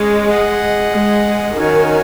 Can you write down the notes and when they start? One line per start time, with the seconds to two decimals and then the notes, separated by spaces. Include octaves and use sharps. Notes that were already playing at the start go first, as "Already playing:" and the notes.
Already playing: G#3 C#4 C#5
0.27 G#4 D#5 F#5
0.92 G#3
1.57 D#3 C#4 F#4 C#5 G#5